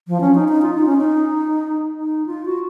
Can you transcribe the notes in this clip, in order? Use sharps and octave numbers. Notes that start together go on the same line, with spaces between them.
F3
C#4
D#4
D#4
F4
D#4
C#4
D#4
D#4
F4
F#4